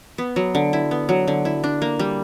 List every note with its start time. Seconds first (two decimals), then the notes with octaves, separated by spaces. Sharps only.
0.18 B3
0.36 F#3
0.55 D3
0.73 E4
0.91 B3
1.09 F#3
1.28 D3
1.45 E4
1.64 D4
1.82 A#3
1.99 G3